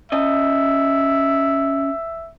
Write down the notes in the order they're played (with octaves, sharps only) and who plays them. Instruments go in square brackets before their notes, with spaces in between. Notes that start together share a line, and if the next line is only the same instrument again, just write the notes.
[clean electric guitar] C#4 D#5 [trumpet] E5